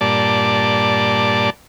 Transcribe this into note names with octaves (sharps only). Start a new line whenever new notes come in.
G2 A#2 D5 A5